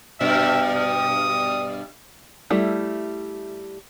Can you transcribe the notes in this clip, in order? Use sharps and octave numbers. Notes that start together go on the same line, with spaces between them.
G2 B2 E5
D#6
G3 A3 E4